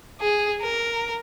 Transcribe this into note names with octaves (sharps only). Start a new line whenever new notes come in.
G#4
A#4